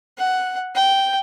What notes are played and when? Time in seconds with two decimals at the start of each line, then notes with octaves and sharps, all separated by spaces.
0.18 F#5
0.75 G5